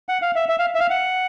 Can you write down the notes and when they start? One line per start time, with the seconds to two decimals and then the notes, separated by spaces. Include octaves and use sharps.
0.09 F#5
0.22 F5
0.35 E5
0.49 E5
0.59 F5
0.75 E5
0.80 F5
0.90 F#5